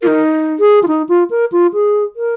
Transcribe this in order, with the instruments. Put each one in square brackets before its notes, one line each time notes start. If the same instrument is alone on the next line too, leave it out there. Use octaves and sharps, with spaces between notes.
[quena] F4 [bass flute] A#4
[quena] D#4
[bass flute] G#4
F4
D#4
F4
A#4
F4
G#4
A#4